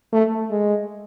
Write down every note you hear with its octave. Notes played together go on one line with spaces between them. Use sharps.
A3
G#3